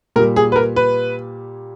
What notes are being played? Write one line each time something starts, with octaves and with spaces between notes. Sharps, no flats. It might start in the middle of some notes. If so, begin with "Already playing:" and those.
A#2 G3 A#4
G#4
B4
A#4
B4